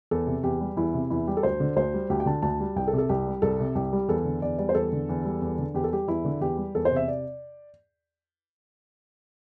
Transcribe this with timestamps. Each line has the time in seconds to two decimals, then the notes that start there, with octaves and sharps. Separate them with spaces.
0.11 E2 A4
0.27 C3
0.43 E2 G4
0.61 G3
0.76 E2 E4
0.94 C3
1.10 E2 E4
1.27 G3 G4
1.37 A4
1.43 D2 C5
1.60 D3
1.76 D2 C5
1.94 G3
2.10 D2 G4
2.20 G5
2.26 D3 A5
2.42 D2 A5
2.60 G3
2.76 C2 G5
2.87 A4
2.93 C3
2.98 A4
3.09 C2 G4
3.27 G3
3.42 C2 A4
3.60 C3
3.75 C2 G4
3.93 G3
4.08 E2 A4
4.25 D3
4.42 E2 D5
4.58 G3 D5
4.69 C5
4.75 E2 A4
4.92 D3
5.09 E2
5.25 G3
5.42 E2
5.58 D3
5.74 E2 G4
5.84 A4
5.91 G3 G4
6.08 E2 E4
6.25 D3
6.41 E2 G4
6.57 G3
6.75 E2 A4
6.85 C5
6.91 C3 E5
7.08 D5